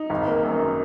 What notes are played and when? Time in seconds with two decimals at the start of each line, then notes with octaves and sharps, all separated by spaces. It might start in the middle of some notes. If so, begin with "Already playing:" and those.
Already playing: D#4
0.10 G#1
0.27 A#3
0.43 F#2